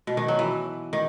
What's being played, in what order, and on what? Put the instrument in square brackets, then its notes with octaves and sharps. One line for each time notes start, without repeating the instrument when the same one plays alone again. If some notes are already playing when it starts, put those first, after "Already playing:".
[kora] B2
D#3
F#3
E3
D#3